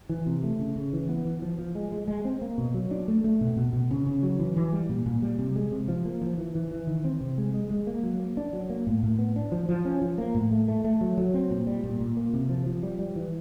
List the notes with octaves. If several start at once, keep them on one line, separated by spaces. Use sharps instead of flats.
E3
C3
A3
C#3
C#3
E3
B3
E3
F3
F3
G#3
G#3
G#3
C4
A#3
B2
F#3
D4
A3
A3
B2
B2
B2
C#3
C#3
F#3
E3
E3
G3
A#2
A#2
G3
C3
G#3
C3
F3
A#3
F3
E3
E3
E3
D#3
C4
C3
G#3
G#3
G#3
A#3
F#3
A#3
D4
F#3
A#3
A2
A2
B3
D4
F3
F3
C#4
F3
A#3
A2
A3
A3
A3
F#3
F#3
C4
A#2
G3
A#2
A#2
A#3
C3
F3
F3
G3
G3
E3